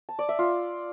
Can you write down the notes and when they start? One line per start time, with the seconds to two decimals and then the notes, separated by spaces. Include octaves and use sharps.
0.09 A5
0.19 D5
0.29 E5
0.39 F4